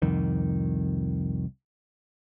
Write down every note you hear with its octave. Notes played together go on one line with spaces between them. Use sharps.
C2 F2 D#3